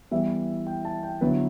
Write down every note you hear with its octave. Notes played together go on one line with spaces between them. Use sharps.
E3 G3 B3 E4 E5
G5
A5
G5
D3 F#3 B3 E4 B4